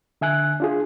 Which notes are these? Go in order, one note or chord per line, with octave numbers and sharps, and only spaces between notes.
D3 E5 G#5 F#6
D4 F4 G#4